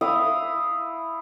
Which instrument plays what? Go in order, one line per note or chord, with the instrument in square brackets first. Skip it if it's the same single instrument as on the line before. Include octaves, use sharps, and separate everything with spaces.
[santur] E4 F5 D#6